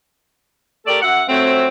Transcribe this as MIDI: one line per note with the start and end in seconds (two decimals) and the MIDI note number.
0.86 0.99 57
0.86 0.99 67
0.86 0.99 69
0.86 0.99 70
0.86 0.99 74
1.02 1.23 42
1.02 1.23 76
1.02 1.23 78
1.28 1.67 41
1.28 1.67 54
1.28 1.67 57
1.28 1.67 60